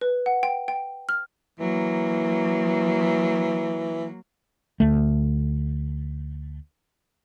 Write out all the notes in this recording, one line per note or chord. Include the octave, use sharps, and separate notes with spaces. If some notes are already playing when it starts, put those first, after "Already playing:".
B4
F#5
G5
G5
F6
E3 F#3 A#3
D2 A3